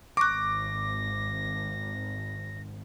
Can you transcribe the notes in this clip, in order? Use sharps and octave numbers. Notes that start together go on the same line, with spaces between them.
G#1 C#6 D6 F#6 A#6